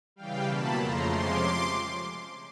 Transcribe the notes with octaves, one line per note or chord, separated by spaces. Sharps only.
C#3 E3 G3 F5 G5
B2 F#3 A#3 A5 B5
F2 C#3 F3 A3 A#5 C6
C3 F3 G#3 C#4 C6 D6